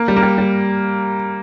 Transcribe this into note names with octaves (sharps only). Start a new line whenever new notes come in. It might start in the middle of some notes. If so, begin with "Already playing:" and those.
Already playing: A#3
G3
A#3
G3
G3